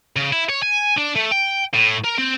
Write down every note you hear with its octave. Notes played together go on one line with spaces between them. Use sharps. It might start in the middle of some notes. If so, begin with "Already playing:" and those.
C#3
E4
C#5
G#5
D4
A3
G5
A2
A#4
C4